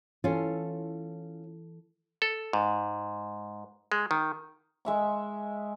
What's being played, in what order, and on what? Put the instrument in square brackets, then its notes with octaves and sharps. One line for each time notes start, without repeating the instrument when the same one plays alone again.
[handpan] E3 A4 [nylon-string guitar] C#4 F4
[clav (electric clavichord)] A4
G#2
G#3
D#3
[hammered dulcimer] G#3 E5 C#6